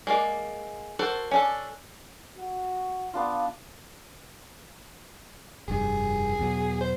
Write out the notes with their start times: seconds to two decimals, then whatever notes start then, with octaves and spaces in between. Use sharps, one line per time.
0.07 G#3 A#3 D5
0.99 F#4 A4 A#4 C5
1.31 C#4 D4 A4
2.39 F#4
3.13 B3 D4 F4
5.68 F1 G2 G#4
6.39 E2 B2 F#3
6.81 C5